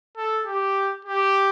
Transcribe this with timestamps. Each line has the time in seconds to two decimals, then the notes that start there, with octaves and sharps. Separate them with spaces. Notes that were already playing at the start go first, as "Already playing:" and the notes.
0.17 A4
0.46 G4
1.05 G4